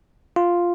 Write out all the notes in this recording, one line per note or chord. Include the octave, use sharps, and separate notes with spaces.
F4